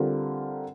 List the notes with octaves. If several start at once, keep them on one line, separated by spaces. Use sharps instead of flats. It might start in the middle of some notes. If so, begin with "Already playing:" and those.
Already playing: D3 G3 C4 F4 A#4